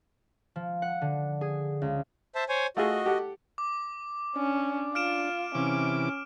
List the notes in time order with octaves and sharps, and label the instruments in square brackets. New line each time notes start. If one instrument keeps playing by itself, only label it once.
[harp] F3
F#5
D3
G#4
C#2
[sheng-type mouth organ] C5 E5 A5
C5 C#5 G#5
[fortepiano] A3 F4 G#4 [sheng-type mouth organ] F#4 D#5
[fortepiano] G4 A4 F#5
[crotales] D6
[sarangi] C#4 [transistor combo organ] D4
[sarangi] F4 [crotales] F6 D7 E7
[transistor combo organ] C3 E3 D6 [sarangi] C#4